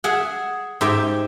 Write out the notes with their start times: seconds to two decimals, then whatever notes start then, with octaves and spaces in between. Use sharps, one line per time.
0.04 G#4 E5 F#5
0.81 G#2 G4 E5 G5